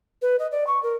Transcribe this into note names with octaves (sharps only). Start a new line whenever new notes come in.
B4
D#5
D5
C#6
A#4